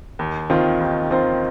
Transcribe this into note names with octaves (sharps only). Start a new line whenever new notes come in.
D#2
D#3 C4 F4 C5
D#2
D#3 C4 F4 C5